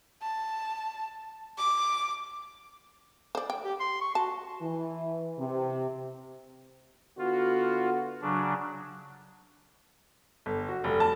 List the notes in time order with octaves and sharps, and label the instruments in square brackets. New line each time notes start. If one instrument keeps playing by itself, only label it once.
[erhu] A5
D6
[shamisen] C5 D5
G5
[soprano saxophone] G4
C6
C#6
[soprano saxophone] F#4 [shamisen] A5
[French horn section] E3
C3
[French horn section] D3 B3 F#4 [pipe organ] F4
[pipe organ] C#3 F#3 D4
[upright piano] G1
F#4
F1
A5